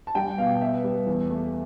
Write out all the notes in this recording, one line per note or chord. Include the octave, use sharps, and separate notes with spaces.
A5
G3 G5
B2 F5
B3 E5
G3
E2
A3